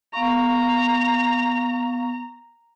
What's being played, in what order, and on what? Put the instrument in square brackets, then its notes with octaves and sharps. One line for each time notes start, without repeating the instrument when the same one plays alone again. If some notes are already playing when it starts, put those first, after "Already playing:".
[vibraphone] B3 F5 C#6 [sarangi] A#5